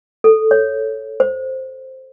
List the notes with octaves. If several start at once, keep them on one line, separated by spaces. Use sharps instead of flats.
A4
C#5
C5